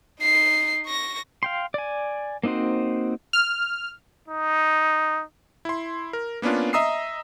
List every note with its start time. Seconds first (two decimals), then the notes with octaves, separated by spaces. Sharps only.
0.21 D#4 C7
0.86 C#6 A#6
1.43 F5 G5 C6
1.74 D5 G#5
2.44 A#3 C4 D#4 F#4 C5
3.33 F6
4.28 D#4
5.65 E4 C6
6.13 A#4
6.42 A#3 B3 C#4 D4 F4
6.73 D#5 E5 A#5 D#6 E6 C7